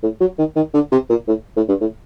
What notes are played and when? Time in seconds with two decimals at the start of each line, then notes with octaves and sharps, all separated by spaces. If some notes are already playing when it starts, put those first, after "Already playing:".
0.03 A2
0.20 F#3
0.38 D#3
0.56 D#3
0.74 D3
0.92 C3
1.09 A#2
1.28 A2
1.57 A2
1.68 G2
1.81 A2